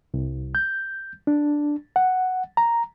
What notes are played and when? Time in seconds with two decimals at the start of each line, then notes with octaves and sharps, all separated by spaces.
0.14 C2
0.55 G6
1.27 D4
1.96 F#5
2.57 A#5